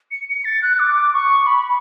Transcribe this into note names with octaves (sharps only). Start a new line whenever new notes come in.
C#7
C#7
A6
F#6
D6
C#6
B5